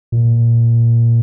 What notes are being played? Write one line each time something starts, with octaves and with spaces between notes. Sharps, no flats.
A#2